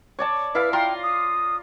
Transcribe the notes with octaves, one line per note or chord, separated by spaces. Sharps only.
C#5 D5 A5
E4 B4 F5 B5
F4 G5 A#5 C6
D#6